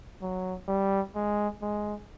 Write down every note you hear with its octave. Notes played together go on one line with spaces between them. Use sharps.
F#3
G3
G#3
G#3